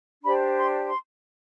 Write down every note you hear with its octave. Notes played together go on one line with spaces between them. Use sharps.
D4 G4 C5 B5
C6
C6